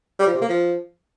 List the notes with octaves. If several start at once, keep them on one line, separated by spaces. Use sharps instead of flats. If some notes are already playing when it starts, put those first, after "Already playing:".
G3
F3
C3
A#3
F3